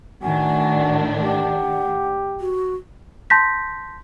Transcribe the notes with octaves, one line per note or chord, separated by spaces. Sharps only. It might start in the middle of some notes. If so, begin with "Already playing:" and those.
A2 D#3 D4 F#4 G#5
G4 F#5
F#4
A5 C6 G6 A#6 B6